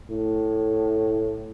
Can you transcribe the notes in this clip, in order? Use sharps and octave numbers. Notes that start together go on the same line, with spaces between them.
A2